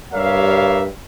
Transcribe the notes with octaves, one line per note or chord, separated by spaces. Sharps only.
G2 G3 A#4 C#5 E5 F5